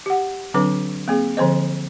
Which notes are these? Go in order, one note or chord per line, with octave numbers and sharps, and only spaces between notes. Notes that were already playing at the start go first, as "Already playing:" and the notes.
G4 F#5
D3 F#3 C4 D4 B4 D6
A#3 C4 G#4
D3 F3 C4 C5 D#5